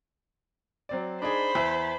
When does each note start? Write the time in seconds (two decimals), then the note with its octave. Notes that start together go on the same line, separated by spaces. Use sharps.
0.89 F#3 C4 D5
1.22 D4 D#4 G#4 C5 B5
1.55 E2 E5